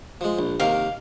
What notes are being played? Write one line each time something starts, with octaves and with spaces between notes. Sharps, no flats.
F3 G#3
A#1
C3 D#3 A#3 F5